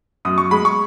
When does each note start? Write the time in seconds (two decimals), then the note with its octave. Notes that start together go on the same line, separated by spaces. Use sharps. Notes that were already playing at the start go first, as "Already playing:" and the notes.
0.25 F#2 D#6
0.38 C#6
0.51 G#3 B5
0.65 C#6